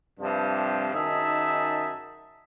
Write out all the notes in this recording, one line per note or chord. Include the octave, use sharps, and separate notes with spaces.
G2 C3 F3
F#2 D#3 D#4 G#4 E5 A5